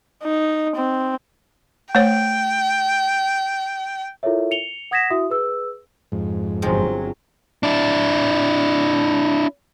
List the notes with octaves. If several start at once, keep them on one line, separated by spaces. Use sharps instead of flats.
D#4
C4
A3 C5 C#5 G5
E4 F4 A4 A#4 C#5 E5
C#7 F7 G7
F#5 D#6 G#6 A#6 B6 E7
E4 F#4 E5 D#6
G#4 B4 E6
F2 G#2
G1 F3 F#3 G#3 C4
D4 E4